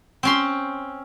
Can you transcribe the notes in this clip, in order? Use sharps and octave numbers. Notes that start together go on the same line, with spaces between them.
C4 C#4 C6